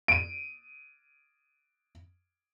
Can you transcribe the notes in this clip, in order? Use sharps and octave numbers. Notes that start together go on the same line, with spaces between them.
D7 D#7